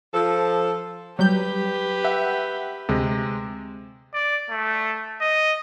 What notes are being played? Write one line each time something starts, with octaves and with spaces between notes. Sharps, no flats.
F3 A4
F#3 G3 G4 B4 G6
E5 F#5 G5
D2 C3 G#3
D5
A3
D#5